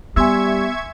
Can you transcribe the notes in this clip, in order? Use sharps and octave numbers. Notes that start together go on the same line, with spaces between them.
G3 B3 E5 G#5 C6 C#6 E6 G#6